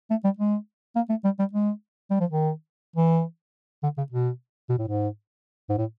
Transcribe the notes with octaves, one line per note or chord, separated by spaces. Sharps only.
A3
G3
G#3
A#3
A3
G3
G3
G#3
G3
F3
D#3
E3
D3
C#3
B2
B2
A2
G#2
G#2
A2